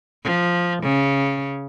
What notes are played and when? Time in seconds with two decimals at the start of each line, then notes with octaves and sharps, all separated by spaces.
0.24 F3
0.83 C#3